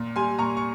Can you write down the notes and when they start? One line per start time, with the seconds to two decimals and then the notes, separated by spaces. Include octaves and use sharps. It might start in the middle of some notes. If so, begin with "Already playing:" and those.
Already playing: A#2
0.16 G3 G#5 C6
0.39 A#2 A#5 C#6
0.57 C#6